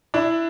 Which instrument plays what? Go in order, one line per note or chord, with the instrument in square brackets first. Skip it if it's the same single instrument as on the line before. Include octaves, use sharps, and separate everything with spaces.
[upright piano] D4 E4